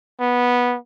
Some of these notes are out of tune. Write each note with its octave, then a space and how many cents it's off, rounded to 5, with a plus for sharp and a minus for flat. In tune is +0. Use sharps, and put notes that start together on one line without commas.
B3 -10